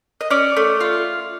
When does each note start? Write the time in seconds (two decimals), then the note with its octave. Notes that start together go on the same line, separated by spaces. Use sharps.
0.21 D#5
0.30 C#4 D5
0.57 A3
0.80 F4